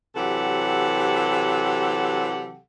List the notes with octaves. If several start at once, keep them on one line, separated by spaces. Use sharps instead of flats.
C3 E3 F#3 G4 A4 F#5